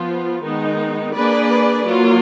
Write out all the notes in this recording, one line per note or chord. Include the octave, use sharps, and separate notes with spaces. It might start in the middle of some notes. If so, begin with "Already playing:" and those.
Already playing: F3 B3 F4
D#3 G#3 B3 D#4
A#3 D4 G#4 B4 D5
F#3 A#3 F4